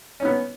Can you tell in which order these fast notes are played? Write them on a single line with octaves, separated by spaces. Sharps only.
C#4 D#4 B3